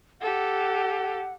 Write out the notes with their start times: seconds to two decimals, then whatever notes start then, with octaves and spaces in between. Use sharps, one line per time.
0.21 G4 A4 F#5